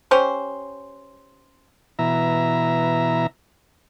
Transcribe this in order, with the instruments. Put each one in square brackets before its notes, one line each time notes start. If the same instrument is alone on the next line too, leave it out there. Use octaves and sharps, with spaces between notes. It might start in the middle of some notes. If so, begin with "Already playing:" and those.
[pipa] C#4 G4 C5
[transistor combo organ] B2 E3 E5 A#5